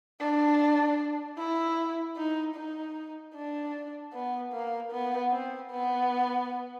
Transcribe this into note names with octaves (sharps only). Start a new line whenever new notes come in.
D4
E4
D#4
D#4
D4
B3
A#3
B3
C4
B3